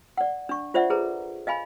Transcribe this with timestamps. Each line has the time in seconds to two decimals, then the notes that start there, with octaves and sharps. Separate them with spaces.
0.17 D5 F#5
0.49 D4 C#6
0.74 F4 C5 D5 E5 F#5
0.90 G#4 A4 B4 C5 A#5
1.47 D#5 F5 G#5 B5